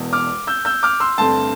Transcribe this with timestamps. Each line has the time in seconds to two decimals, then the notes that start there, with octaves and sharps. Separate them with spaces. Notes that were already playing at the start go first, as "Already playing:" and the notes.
Already playing: E1 E2 B2
0.13 D6 F6
0.47 E6 G6
0.65 E6 G6
0.83 D6 F6
1.00 C6 E6
1.18 G2 D3 A3 C4 A5 C6